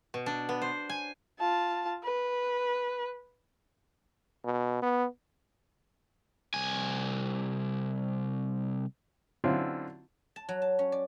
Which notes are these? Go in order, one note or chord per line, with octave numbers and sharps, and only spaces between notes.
B2
D4
B3
C5
G#5
F4 A5
B4
B2
B3
C2 G#5
D3 F#3 C4 C#4 E4 F4
A5
F#3
A5
C#4
D5